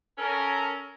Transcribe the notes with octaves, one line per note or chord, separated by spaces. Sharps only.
C#4 A4 A#4